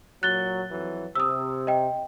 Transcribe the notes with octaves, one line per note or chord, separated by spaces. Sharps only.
A#2 F#3 F#6 A6 G7
F2 E3 F#3
C3 D#6 E6
D#5 G5